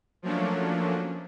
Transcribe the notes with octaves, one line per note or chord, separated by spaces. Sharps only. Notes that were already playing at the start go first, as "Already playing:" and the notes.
F3 F#3 A3 A#3 C#4 D4